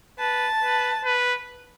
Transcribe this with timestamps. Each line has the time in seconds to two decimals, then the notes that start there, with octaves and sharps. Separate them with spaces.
0.19 B4 A5
0.62 B4
1.05 B4